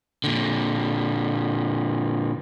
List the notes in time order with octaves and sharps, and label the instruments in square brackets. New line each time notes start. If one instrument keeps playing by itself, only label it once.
[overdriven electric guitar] A#2 D3